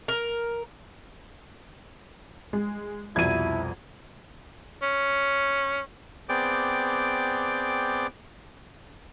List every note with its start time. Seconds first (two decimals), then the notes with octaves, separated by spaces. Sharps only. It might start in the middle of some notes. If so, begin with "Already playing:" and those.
0.08 A#4
2.53 G#3
3.16 C2 F2 B2 E4 G#6 D#7
4.82 C#4
6.29 B3 C4 G#4 D5 G5 D6